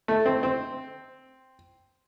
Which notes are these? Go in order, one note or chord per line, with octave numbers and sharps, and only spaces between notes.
A3
C4
C4